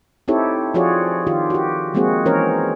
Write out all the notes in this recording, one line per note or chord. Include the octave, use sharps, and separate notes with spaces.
C4 D#4 E4 G4 A4 C#5
F3 F4 F#4 G#4 C#5 D5
D#3 F4 G4
F#4 G4
F3 G#3 A#3 C4 F#4 G#4
E3 C#4 A#4 C5 C#5